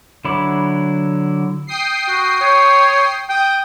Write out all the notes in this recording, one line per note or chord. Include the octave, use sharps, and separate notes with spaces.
D3 F#3 E4 B5 D6
G5 D#6 C7
F#4
C#5
G5 D#6